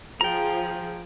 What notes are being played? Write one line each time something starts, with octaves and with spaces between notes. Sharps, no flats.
F3 G#4 G5 A#5